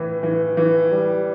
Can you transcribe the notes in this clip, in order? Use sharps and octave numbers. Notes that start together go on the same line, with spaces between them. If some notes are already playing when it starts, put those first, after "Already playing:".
Already playing: A2 E3
E3
E3
G3